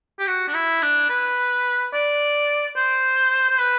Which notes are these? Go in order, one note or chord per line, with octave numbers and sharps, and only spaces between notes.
G4
F#4
D4
E4
D4
B4
D5
C5
C5
B4